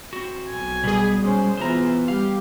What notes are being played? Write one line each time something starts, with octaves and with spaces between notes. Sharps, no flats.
C4 F#4
B1 G#5
B2 G3 G#4
G#3 C#4 C5
E3 B3 F4 C5 A#5
G3 G4 F5